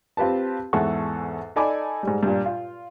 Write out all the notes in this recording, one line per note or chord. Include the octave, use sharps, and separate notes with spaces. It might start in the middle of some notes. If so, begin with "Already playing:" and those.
C4 F4 G4 B4 A5
E2 G#2 A4 F#5 C#6
D#4 A4 D5 G#5 B5 D6
G#2 G3
G2 A#2
F4